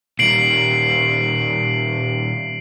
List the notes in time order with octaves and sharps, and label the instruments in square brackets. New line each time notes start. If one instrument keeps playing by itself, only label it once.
[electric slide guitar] A#2 D#3 G3 [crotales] C7 D7 F#7